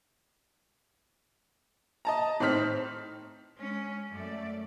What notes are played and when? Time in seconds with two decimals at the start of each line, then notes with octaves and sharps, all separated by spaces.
2.05 D#5 A5 A#5
2.40 A2 C4 D#4 C5 F6 B6
3.55 G#3 C#4
4.09 F#2 A3 D5